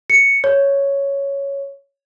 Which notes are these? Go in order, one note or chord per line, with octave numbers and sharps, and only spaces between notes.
C#7
C#5